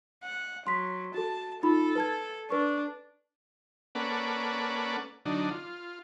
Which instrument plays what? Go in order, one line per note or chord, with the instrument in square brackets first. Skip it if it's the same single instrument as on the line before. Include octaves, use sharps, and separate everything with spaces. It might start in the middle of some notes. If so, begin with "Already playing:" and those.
[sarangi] F#5
[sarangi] F#3 [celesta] C6 B6
[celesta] F#4 A4 [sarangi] A5
[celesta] D#4 F4 B5 [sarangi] A4
[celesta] B4 A5 G#6
[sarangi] D4 [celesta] B4 C#6
[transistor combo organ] A#3 C#4 A4 B4 D5 F#5
D3 F#3 D4 D#4
F4